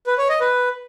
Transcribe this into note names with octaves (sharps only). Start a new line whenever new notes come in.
B4
C#5
D#5
B4